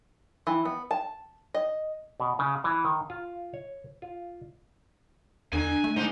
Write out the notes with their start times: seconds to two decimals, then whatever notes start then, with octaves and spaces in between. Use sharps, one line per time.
0.47 E3
0.65 B3
0.91 A5
1.54 D#5
2.20 B2
2.39 C#3
2.64 E3
2.85 D#3
3.10 F4
3.54 C#5
4.02 F4
5.53 E2 D3 G#5
5.84 A3
5.96 G#2 D3 D#4 C5